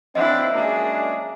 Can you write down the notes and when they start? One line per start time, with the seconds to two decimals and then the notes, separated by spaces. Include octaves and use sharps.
0.15 D#2 C4 D4 E4 D#5 E5
0.53 F#2 G#3 A#3 D4 G#4